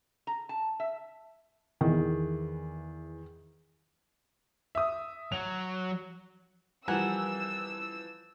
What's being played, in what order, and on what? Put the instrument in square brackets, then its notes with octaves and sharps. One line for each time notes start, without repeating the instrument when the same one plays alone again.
[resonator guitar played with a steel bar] A#5
A5
E5
[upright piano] E2 E3 [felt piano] D#3
[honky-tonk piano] E5 D#6
[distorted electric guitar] F#3 [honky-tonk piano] F7
[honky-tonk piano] E3 F3 [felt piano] G3 [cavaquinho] A#4 F#5 G#5 [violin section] E6